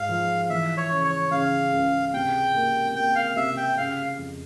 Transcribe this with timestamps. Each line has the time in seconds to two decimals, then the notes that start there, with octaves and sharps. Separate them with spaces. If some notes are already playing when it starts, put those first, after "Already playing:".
Already playing: G#2 F5
0.09 F3
0.50 E3 E5
0.77 C#5
0.91 C#3
1.04 C#5
1.31 C#3 F5
1.73 C#2
2.14 C3 G5
2.55 A#3
2.95 A#3 G5
3.15 F5
3.36 C3 E5
3.57 G5
3.77 C#3 F5
4.18 F2